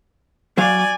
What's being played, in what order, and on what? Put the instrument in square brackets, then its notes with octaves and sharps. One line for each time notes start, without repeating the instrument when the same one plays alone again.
[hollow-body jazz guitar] F#3 F5 [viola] D5 G#5